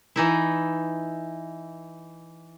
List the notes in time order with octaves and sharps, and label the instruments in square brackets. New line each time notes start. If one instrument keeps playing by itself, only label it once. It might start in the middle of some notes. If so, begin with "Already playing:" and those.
[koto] E3 D#4 E4